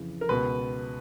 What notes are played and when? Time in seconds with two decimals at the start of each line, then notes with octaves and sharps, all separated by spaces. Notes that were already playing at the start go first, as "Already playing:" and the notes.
Already playing: F2 C#3 E3
0.21 A#4
0.29 C#2 B2 B4